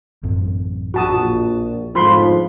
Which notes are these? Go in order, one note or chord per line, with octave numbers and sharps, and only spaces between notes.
A1 F#2 C4
A#1 F#4 A5 D#6
G1 F2 G#2 F3 F4 B5 C6